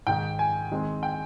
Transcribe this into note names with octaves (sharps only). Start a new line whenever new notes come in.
G#2 D#3 G#3 G5
G#5
D#3 G#3 C4
G5